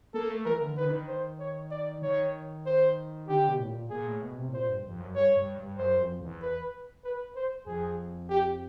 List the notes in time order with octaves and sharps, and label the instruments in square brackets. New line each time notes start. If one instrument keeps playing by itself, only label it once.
[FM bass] A#3 [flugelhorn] A4
[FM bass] A3
[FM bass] E3 [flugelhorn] A#4
[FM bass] D3
[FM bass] D#3 [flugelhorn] B4
[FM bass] D3
D#3
[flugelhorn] C5
C#5
D5
[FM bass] D#3 [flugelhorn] C#5
[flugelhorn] C5
[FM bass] D3 [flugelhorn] G4
[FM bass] B2
A2
A#2
[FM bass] A#2 [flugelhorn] G#4
[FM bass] A2
B2
C3
A2
[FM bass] A#2 [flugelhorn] C5
[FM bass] G2
F2
F#2
[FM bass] G2 [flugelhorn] C#5
[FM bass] G2
G2
[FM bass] F#2 [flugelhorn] C5
[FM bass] F2
E2
[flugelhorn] B4
B4
C5
[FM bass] F2 [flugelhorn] G#4
[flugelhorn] G4